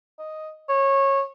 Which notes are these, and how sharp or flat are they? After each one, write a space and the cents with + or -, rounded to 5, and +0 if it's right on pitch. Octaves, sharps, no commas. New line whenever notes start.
D#5 +5
C#5 -20